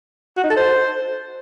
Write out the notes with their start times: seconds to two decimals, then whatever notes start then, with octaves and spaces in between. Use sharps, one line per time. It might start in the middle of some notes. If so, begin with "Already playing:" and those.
0.37 F#4
0.44 D#4
0.50 A4
0.57 C5